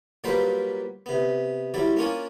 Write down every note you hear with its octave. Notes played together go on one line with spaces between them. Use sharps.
A#2 F#3 G3 A#3 B4 C5
C3 B3
F#3 G3 E4 D5
A#3 C#4 D4 F4 C#5 G#5